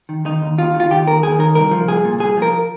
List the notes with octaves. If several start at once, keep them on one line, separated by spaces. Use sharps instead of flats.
D#3
D#3 D#4
D#2
D#2 F4
D#3
F4
D#3 G4
D#2 A#4
D#2 G#4
D#3 A#4
C2 A#4
F3
C2 G#4
A#2
C2 G#4
F3
A#4